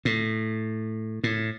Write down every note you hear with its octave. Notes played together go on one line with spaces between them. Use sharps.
A2
A2